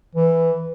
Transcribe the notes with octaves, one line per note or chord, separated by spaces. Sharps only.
E3